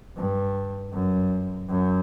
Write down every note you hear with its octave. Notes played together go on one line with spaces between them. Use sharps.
G2
F#2
F#2